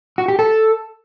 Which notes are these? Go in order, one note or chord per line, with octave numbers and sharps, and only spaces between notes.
F#4
G4
A4